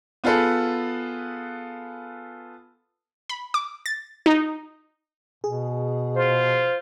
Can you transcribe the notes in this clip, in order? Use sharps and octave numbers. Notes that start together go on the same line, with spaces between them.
B3 F4 G#4 A4 B4
B5
D6
A6
D#4
B2 G#4
F4 C5